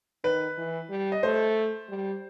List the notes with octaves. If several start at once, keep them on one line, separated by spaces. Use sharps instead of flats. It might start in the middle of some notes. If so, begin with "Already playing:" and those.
D#3 B4
E3
G3
D#5
A3 C5
G3